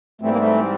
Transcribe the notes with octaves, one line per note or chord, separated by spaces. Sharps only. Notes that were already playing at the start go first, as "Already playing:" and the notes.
G#2 E3 G3 A3 C4
A#3
A3